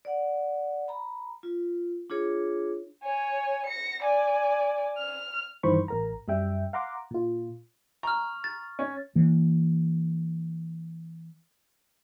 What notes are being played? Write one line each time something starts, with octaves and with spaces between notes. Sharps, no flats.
D5 F#5
A#5 B5
F4
D4 F4 G#4 C#5
C#5 G#5
A#6 C#7
D5 G#5
F6
G2 D#3 E3 C5 B5 C#6
A1 A#4 A#5
F#2 G3 E5 G5
F5 F#5 A#5 C6 D6
A#2 F4
A#5 C#6 F6
A6
C#4
E3 A#3